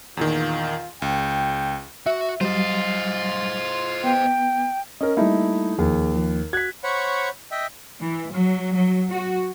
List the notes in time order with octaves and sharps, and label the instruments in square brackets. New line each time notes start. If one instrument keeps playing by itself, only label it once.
[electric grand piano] E2 A#2 D#3 [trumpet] F4
[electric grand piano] C#2 [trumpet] G5
[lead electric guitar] F#4 [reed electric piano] E5
[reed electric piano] F#3 G3 [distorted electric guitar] F4 [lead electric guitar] C5 D#5
[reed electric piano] B3 [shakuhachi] G5
[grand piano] C#4 A#4 [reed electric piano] D#5
[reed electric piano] G3 A#3 [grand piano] A3 D#4 E4
[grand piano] D#2 [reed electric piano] F3 G#4
[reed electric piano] F3
[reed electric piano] F#4 F#6 [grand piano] G#6 B6
[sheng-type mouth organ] C5 C#5 F#5 B5 C#6
D#5 E5 G5
[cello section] E3
F#3
F#3
F#4